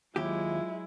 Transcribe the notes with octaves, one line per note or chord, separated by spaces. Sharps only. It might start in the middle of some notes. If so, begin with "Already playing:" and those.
D#2 F#3 G#3 E4 F4 G4